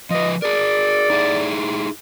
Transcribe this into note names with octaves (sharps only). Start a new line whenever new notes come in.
F3 B4 D#5
G#4 A#4 D5
D#4 E4 G#4